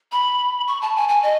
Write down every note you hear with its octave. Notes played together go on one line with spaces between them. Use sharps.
B5
C#6
A5
G#5
G#5
D#5